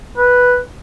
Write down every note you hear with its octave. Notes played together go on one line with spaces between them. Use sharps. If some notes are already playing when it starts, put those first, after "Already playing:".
B4